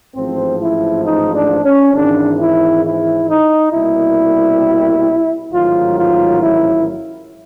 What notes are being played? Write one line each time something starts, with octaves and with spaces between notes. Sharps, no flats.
A1 G#2 F3 C4
E4
D#4
D4
C#4
G#1 G#2 E3 D4
E4
E4
D#4
C2 B2 G3 A#3 E4
A1 G#2 D#3 F#3 F4
F4
E4